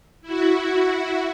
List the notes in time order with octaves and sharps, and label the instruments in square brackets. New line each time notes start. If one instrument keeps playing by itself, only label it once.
[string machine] E4 F#4